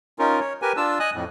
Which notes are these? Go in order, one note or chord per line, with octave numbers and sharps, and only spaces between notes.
C#4 D#4 F4 A#4
C#5
G4 A#4 B4 G#5
D4 F4 A5 E6
D#5 G#5 D#6 F#6
F2 A2